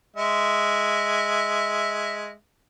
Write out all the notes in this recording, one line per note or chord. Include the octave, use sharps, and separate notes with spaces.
G#3 E5